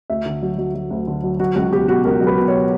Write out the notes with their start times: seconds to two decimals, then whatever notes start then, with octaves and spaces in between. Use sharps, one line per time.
0.10 D2 E5
0.26 D3
0.42 F#3
0.58 F#3
0.75 F#3
0.91 D2
1.07 D3
1.23 F#3
1.40 F#3 F#4
1.56 C#2 F#4
1.72 B2 G4
1.88 B2 F#4
2.05 C#2 A#4
2.21 F#3
2.27 B4
2.37 B2
2.48 C#5